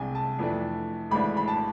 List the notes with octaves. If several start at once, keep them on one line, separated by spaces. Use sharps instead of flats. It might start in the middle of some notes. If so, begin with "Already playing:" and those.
Already playing: C2 C3 G#3 D4 G#5
A5
F2 E3 A3 D4
G#1 G#2 E3 A3 D4 B5
B5
A5